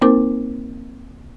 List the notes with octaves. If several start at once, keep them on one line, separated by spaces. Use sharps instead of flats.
A#3 C4 D#4 A#4 C5 D6